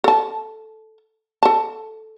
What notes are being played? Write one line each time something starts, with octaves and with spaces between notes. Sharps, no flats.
A4 A5
A4 A5